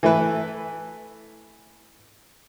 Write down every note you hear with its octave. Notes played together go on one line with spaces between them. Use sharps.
E3 A3 E4 B4 E5